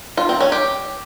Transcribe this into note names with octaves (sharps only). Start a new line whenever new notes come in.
F4
C4
C#4
G4